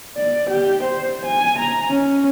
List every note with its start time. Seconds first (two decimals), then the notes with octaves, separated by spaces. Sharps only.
0.17 D5
0.50 G4
0.83 C5
1.25 G#5
1.59 A#5
1.90 C#4